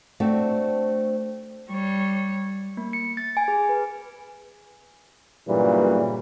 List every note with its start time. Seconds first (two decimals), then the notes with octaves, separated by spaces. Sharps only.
0.20 A3 C4 D4 F#4
1.70 G3 C#5
2.77 A#3
2.93 C#7
3.17 A6
3.37 G#5
3.48 G#4
3.69 B4
5.48 G2 A#2 C#3 E3 F#3 G3